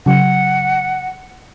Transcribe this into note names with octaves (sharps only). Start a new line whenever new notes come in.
C#3 F#3 F#5